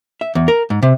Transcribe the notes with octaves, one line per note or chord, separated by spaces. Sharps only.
E5
E2
A#4
G#2
C3